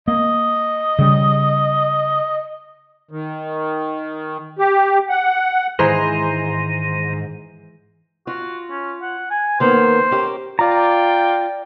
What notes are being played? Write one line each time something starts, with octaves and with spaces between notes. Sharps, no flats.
A#3 D#5
C#3 G3
D#3
G4
F#5
G#2 D#3 E3 G#3 C5 A#5 C6
F4 F#4
C#4
F#5
G#5
D#3 A#3 B3 C5
C#4 G4 A#4
F4 D5 G5 A#5